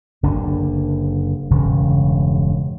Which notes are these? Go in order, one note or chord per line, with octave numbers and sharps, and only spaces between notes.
F#1 D3 D4
E1 G2 C#3